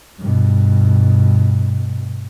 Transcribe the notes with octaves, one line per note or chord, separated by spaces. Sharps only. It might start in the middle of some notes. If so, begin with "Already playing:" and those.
G2 B2